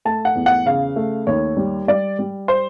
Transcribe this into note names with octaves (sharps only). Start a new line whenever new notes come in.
A3 A5
F#5
E2
F#5
C#3 F5
A3
D#2 C#5
G3
G3 D5
G3
C5